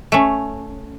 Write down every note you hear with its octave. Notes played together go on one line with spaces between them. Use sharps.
A3 C#4